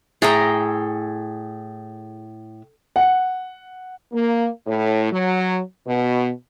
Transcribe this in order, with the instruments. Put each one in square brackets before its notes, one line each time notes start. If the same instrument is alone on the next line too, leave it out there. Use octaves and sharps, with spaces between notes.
[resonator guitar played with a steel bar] A2 [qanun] G#4 G5 A#5
[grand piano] F#5
[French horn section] A#3
A2
F#3
B2